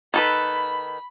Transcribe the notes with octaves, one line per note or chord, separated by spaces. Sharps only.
D#3 A4 B4 B5